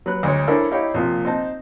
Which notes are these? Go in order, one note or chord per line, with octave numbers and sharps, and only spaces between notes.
F#3 B4 F#6
D2 G#3 C#5
C#4 D4 E4 A4 A#4 C5
D#4 E4 G4 C#5 F5
A#1 C3 F3
C4 D#4 A5